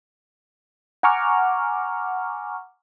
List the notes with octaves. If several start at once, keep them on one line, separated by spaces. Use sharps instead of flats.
F#5 G#5 A#5 C#6 D6 F6